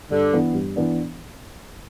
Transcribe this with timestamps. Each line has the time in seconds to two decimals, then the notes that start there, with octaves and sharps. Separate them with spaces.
0.11 G2 D3
0.33 E3 B3 D4
0.54 G2
0.76 E3 B3 D4